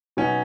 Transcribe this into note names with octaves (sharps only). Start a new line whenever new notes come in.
B2 F#3 B3 C#4 D#4